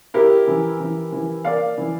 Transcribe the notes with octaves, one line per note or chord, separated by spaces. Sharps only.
E4 G4 A#4
E3
E3
E3
A#3 D5 F5
E3